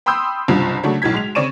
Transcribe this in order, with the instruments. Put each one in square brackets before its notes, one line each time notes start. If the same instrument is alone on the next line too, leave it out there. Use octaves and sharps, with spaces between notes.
[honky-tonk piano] G5 B5 C6 D#6 E6 G6
F#1 C2 G2 F3
C#3 F#3 A3 D4 F#4
B1 A2 F#3 G#6 B6
G#3 F7
C#3 C4 D5 C#6 D#7 E7